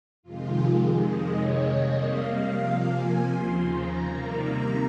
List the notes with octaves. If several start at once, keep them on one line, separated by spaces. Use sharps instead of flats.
F2 C3 D#3 G#3 F4
F2 C3 D#3 G#3 D#5
C#5
C3 G3 A#3 D#5
F5
C3 F3 A#3
G#5
D#2 C#3 F3 C6
A#5
C3 D#3 G3 A#3
A#5